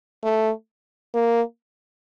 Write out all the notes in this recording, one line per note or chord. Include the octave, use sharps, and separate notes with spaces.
A3
A#3